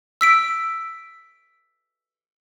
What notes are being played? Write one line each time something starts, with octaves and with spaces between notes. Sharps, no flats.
E6 B6 D7